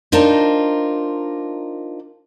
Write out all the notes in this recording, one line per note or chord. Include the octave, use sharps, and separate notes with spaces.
D4 D#4 F4 A#4 C5